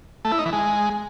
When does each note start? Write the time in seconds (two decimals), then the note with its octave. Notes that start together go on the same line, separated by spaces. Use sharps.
0.25 A3
0.32 E4
0.39 D#4
0.46 E3
0.53 G#3